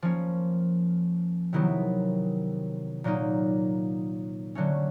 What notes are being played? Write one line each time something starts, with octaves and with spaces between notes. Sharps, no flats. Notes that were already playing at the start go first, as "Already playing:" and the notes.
F3 A#3 C#4
C3 D#3 F#3 B3 E4
A#2 F#3 A#3 D#4
D3 F#3 A3 C#4